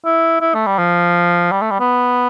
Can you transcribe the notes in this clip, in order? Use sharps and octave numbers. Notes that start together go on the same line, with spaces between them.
E4
E4
A3
G3
F3
G3
A3
G3
B3